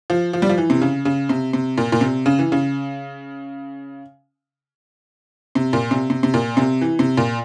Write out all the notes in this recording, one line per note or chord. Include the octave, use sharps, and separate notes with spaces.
F3
F3
G3
F3
E3
C3
C#3
C#3
C3
C3
A#2
A#2
C3
C#3
E3
C#3
C3
A#2
C3
C3
C3
A#2
C3
E3
C3
A#2